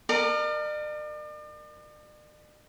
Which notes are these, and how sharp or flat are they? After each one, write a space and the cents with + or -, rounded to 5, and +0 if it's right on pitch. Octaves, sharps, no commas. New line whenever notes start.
A#4 +0 D5 +45 A5 +35